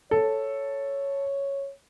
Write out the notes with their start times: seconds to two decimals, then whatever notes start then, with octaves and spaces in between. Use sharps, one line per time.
0.11 A4 C#5